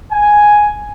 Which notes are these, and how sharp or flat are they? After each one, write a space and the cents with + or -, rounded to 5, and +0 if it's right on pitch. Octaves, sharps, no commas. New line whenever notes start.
G#5 +5